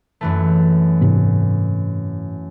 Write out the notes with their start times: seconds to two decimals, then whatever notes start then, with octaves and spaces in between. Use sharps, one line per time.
0.21 F#2 E3 A3
1.01 G#2 C3 B3